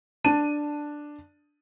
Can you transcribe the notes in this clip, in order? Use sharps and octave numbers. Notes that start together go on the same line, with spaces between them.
D4 A5 D#7